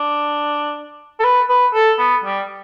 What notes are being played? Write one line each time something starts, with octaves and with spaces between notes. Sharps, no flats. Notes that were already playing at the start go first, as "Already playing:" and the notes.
Already playing: D4
A4
B4
B4
A4
B3
G3